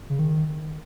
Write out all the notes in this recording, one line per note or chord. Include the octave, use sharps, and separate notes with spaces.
C#3
D#3